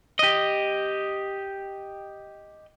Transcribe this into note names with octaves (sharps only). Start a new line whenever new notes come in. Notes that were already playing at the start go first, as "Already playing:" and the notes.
G4 D#5